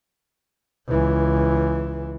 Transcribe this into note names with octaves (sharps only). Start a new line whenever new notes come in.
C#2 E3